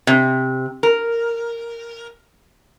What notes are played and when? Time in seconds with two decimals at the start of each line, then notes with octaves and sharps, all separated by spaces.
0.07 C3
0.83 A#4